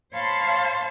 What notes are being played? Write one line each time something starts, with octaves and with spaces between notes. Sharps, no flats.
C5 C#5 F5 A5 B5 C6